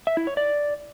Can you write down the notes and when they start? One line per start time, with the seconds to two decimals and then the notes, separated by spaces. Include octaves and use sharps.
0.07 E5
0.17 E4
0.27 C#5
0.37 D5